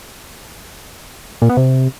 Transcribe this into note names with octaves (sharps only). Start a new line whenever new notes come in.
A#2
B3
C3